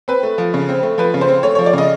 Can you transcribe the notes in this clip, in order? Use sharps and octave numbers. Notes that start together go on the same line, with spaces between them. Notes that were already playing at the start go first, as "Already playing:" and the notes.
C4 B4
A3
F3
C#3
C4
A3
F3 B4
C#3
C5
C4
A3 C#5
F3 C#5
D5
C#3 D#5